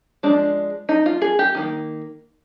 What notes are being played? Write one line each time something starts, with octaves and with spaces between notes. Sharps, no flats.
F3 G#3 D4
D#4
F4
G#4
G4
D#3 G3 A#3